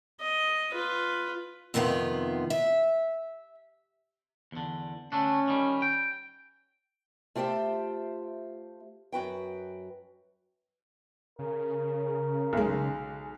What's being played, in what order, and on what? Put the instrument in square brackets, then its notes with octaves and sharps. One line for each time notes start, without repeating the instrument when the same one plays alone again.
[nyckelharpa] D#5
F4 B4
[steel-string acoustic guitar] F2 C3 D#3 B3 F4
E5
[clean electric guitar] E2 D3
[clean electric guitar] D3 A3 D4 [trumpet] C#4
[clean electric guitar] D#3 G3
G5
[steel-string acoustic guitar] A3 F4 G4 C5 E5
F#2 F#4 B4 G5
[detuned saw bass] C#3 [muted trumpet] A#4
[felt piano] B1 G#3